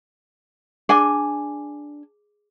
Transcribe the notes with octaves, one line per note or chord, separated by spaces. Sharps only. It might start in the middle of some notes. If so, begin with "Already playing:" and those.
D4 G#4 G#5 D6